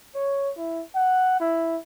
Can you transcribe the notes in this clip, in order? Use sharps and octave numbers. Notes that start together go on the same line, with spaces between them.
C#5
E4
F#5
E4